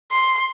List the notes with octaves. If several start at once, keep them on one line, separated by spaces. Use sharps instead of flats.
C6